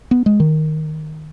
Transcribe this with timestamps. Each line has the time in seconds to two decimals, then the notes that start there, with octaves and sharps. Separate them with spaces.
0.11 B3
0.26 G#3
0.40 D#3